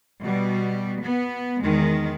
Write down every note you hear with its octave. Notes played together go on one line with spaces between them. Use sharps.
B2 G3
B3
E2 D#3 G#3